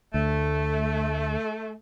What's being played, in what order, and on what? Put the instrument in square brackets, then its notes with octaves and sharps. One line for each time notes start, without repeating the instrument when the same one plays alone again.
[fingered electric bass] D2 [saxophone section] A3